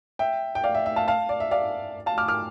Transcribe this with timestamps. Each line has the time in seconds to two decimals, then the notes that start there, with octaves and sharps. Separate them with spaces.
0.19 E5 G5
0.55 G5
0.64 D5 F5
0.75 E5
0.86 E5
0.96 F5 A5
1.08 F5 A5
1.29 D5
1.40 E5
1.51 D5 F5
2.06 F5 A5
2.18 D6 F6
2.28 D6 F6